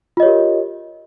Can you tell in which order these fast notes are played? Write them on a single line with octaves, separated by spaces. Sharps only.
F4 D#5 C#5 G4 A#4